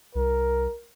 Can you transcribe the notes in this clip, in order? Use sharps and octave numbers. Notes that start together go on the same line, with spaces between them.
C2 A#4